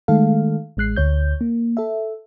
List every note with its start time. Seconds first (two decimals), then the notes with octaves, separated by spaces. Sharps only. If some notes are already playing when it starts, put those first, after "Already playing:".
0.08 D#3 G#3 A3 A4 F5
0.77 A1 G#3 F#6 C7
0.96 D2 C#5 G6
1.41 A#3
1.77 A4 E5